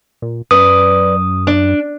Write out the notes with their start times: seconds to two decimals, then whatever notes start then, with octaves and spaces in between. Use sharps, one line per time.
0.22 A#2
0.51 F#2 B4 D5 D#6
1.47 D4